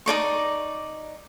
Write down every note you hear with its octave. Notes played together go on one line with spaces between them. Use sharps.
D#4 A#4 D5 C#6